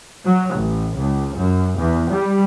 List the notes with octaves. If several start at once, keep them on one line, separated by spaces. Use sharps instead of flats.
F#3
A1
C#2
F#2
E2
G3